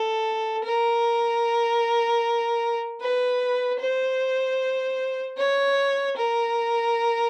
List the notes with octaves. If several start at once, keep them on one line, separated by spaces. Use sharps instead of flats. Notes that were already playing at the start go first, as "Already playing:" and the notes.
Already playing: A4
A#4
B4
C5
C#5
A#4